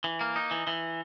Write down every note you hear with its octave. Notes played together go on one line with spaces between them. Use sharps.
E3
A#3
D#4
E3
E3